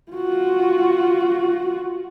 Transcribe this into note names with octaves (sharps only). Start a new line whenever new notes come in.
F4 F#4